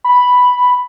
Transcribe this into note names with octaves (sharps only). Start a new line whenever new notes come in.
B5